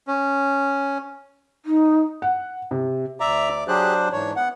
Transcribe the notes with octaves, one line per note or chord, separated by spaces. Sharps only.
C#4
D#4
F#5
C3
D2 D5 E5 A#5 D6
F#3 D4 G4 G#4 C5 F#6
G#2 E3 D4 C#5
B3 F#5